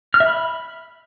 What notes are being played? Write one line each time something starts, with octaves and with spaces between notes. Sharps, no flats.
F6
E5
B5